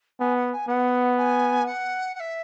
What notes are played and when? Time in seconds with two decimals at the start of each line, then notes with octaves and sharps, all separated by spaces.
0.19 B3 G#5
0.36 F#5
0.52 G#5
0.68 B3 F#5
1.17 G#5
1.66 F#5
2.15 F#5
2.20 E5